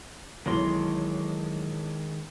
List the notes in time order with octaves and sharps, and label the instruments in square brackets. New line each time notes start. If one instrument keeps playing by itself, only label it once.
[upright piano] B1 E3 [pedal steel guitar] D#3 G#3 C6 [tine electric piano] F#3 C#5 A#6